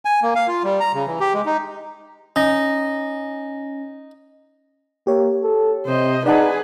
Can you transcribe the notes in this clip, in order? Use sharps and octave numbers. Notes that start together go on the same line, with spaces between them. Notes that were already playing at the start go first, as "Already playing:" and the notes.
G#5
A#3
F5
F4
G3
A#5
C#3
E3
G4
G#3
D#4
C#4 D#4 A#6
A#3 G4 C#5
A4
C3 C5 D#5
D#4 G#4 B4 D5 F#5 A5